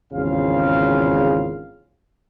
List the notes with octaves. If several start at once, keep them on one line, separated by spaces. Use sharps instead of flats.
G#1 E2 C#3 F4 F5